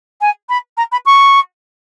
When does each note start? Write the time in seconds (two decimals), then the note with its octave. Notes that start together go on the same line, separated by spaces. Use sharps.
0.21 G#5
0.49 B5
0.77 A#5
0.92 B5
1.06 C#6